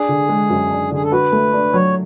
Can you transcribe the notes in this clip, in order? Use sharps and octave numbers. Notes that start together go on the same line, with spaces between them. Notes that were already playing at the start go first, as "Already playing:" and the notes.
Already playing: D4 G#4
D3
G#3
F#2
D4
D3 G#4
A4
F#4 B4
A3
D4
F#3 C#5